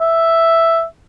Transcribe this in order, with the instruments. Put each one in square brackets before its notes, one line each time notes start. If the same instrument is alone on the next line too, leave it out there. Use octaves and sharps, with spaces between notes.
[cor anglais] E5